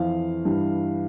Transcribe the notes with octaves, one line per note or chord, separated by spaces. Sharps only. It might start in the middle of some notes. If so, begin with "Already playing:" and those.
Already playing: F2 E3 F5
G2 E3